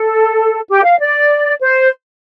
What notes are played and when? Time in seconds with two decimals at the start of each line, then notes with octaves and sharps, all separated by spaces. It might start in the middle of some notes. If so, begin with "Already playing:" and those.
Already playing: A4
0.68 G4
0.84 F5
0.99 D5
1.60 C5